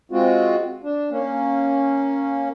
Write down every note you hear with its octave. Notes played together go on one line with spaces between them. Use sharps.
G#3 C4 F4 F#4
D4
A#3 C#4